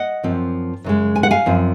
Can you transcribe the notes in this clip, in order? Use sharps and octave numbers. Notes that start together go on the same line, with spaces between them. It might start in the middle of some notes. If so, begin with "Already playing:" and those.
Already playing: D#5 F#5
F#2 F3 C4
F#2 C#3 G#3
G#5
F#5
F5 G#5
F#2 F3 C4